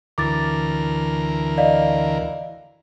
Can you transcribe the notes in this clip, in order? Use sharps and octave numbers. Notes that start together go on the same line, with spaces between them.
D2 E3 A#4 D6 A6
D5 D#5 F5